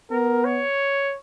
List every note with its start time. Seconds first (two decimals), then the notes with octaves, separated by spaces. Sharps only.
0.11 B3 A#4
0.45 C#5